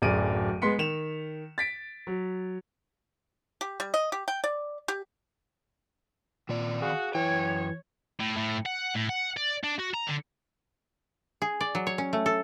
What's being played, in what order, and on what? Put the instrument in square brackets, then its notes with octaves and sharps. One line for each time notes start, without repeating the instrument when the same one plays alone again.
[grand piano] D1 F#2 G#4 D5 D7 D#7
G#3 B3 C6 B6 C#7
D#3 E7 F7
A6 B6 D7
F#3
[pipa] G4
G3
D#5
G4
G5
D5
G4
[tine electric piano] A#2 [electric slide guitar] D#3 C4 D5
[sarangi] F#4 [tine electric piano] G#4 F5
[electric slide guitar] F#2 G5 [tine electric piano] E3 [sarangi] C#5
[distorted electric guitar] A2
A2
F#5
A2
F#5
D5
D4
F#4
A#5
D3
[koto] G#4
D5
F#3
C#5
C#4
A3
A4